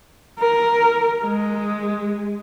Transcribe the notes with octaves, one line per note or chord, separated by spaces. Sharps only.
A#4
G#3